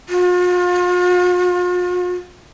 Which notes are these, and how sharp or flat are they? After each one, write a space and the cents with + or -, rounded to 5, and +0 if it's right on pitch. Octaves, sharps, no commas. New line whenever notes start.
F4 +40